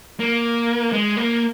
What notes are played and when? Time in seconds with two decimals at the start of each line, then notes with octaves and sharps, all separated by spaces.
0.20 A#3
0.92 G#3
1.17 A#3